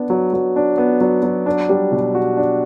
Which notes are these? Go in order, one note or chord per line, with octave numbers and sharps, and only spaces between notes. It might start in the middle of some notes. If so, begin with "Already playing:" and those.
Already playing: B3 D4
F#3
F#3
D4
B3
F#3
F#3
D4
G3
B2
F#4
D4